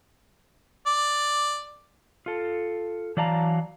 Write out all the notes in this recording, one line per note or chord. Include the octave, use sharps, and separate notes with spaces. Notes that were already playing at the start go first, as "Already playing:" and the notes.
D5
F4 A4
E3 F#3 D5 F5 A5 A#5